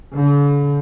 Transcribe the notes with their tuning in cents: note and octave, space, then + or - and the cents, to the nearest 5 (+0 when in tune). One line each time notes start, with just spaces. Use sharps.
D3 -45